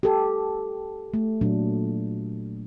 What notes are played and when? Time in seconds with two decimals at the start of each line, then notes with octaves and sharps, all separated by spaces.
0.03 G4 A4
1.14 A3
1.41 A#2 F#3 D4